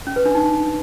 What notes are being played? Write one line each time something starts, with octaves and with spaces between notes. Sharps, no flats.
C#4
B4
D4
D#4